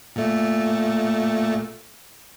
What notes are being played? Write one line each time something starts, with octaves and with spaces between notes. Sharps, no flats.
A#2 A3